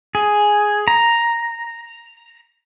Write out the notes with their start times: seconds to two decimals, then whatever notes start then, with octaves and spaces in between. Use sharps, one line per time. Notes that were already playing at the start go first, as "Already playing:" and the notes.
0.15 G#4
0.88 A#5